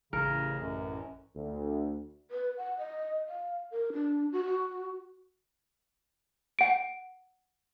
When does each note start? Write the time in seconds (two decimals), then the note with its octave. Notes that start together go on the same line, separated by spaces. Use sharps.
0.13 A1 C#3 A#4
0.61 F#2
1.35 D2
2.31 B4
2.57 F#5
2.78 D#5
3.28 F5
3.71 A#4
3.93 D4
4.32 F#4
4.46 F#4
6.59 F#5 D7